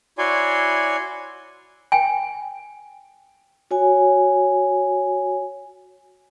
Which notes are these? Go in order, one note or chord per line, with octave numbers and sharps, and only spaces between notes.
E4 F#4 C#5 D5 G#5 C6
G5 G#5
F#4 C#5 G#5